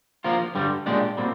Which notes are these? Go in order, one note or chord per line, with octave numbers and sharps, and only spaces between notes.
F3 A#3 F4 A#4
G2 D3 G3
A#2 G#3 D4 G4 D5
A#2 G3 C4